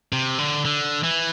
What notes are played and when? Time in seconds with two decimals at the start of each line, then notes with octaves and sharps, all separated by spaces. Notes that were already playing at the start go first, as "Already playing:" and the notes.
0.13 C3
0.38 D3
0.65 D3
1.04 E3